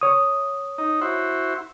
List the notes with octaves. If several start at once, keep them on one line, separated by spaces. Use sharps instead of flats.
C#5 D#6
D#4
E4 F#4 C5